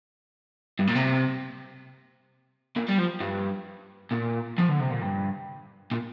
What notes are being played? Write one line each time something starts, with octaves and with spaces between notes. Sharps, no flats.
G2
A#2
C3
A#2
G3
F3
G2
A#2
F3
D3
C3
A#2
G2
A#2